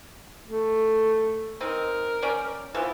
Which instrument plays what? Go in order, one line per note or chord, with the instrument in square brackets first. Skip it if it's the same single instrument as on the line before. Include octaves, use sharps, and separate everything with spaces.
[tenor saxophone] A3
[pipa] C4 D#4 [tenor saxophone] A#4
[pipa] C#4 D5 G5
[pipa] E3 F3 B3 [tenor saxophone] E4